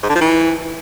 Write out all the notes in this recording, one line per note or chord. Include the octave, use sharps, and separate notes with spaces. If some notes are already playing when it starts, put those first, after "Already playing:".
G#2
D3
F3
E3